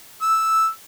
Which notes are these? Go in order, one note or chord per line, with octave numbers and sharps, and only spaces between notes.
E6